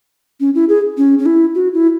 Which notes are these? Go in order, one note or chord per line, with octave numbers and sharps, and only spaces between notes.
C#4
E4
G#4
C#4
C#4
E4
F#4
E4